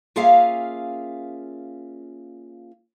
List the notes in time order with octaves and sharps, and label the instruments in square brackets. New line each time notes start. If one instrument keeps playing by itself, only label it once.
[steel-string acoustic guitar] A#3 C#4 F4 G#4 E5 F5